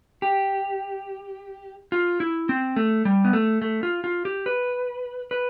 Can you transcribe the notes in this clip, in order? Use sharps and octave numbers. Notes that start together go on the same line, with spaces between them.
G4
F4
E4
C4
A3
G3
B3
A3
A3
F4
F4
G4
B4
B4